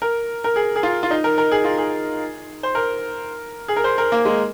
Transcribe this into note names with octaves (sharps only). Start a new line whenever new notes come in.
A#4
A#4
G#4
G#4
F4
F4
D#4
A#4
A#4
G#4
F4
G#4
C5
A#4
G#4
A#4
C5
A#4
A#3
G#3